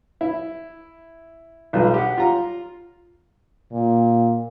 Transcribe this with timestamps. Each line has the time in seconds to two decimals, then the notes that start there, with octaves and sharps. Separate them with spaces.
0.21 E4
1.73 B1 G3 F4
1.94 G4 F#5
2.18 F4 A#5
3.72 A#2